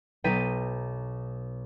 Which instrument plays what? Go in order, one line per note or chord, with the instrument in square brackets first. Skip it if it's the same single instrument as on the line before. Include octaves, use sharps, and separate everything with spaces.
[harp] B1 D#4 G5 A6 B6 D#7